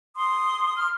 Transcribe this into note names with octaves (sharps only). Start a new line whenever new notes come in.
C6 D#6
F6